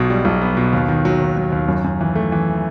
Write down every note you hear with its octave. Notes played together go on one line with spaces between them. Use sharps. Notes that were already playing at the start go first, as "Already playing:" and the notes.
Already playing: B1 B2
G3
B1
B3
B2
D#2
D#3
F#3
D#2
F#3
D#2
F#2
F#2
E3
A3
E3